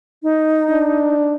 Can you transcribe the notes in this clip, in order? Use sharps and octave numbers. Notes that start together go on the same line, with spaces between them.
D#4
D4